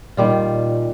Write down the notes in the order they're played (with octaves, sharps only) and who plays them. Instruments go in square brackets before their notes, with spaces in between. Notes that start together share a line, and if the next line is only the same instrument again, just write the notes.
[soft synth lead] A#2 [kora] D#3 G3 F4